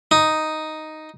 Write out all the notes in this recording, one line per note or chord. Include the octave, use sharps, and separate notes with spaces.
D#4